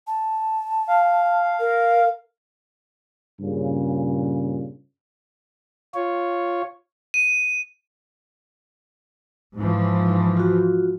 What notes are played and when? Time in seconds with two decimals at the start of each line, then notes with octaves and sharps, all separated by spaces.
0.07 A5
0.87 F5
1.60 A#4
3.41 G2 A#2 C#3
5.94 F4 C#5
7.14 D#7
9.56 G#2 E3 F3
10.37 F4 F#4